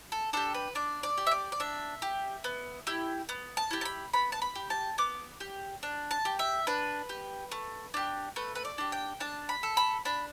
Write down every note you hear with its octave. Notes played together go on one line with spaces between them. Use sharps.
A4
D4 G4 A4
B4
D4 D5
D5
G4
E5
D5
D5
D4 E5
G4
B3
E4 G4
B3
A5
E4 G4
A5
B5
B3 B5
A5
B5
G4
A5
B3 D6
G4
D4
A5
G4
E5
D4 B4
G4
A3
D4 G4
A3 B4
B4
D5
D4 G4
G5
D4 A5
B5
A4
B5
D4 B5